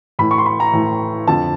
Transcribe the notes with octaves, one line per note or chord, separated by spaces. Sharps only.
A2 E3 B5
C#6
C6
B5
A#5
A2 E3
F2 D3 F3 A5